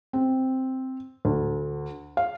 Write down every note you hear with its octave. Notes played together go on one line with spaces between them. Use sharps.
C4
D2
F5